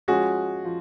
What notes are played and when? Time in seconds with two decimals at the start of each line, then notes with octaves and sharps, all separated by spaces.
0.08 F3 G#3 C#4 F#4 G#4
0.64 F3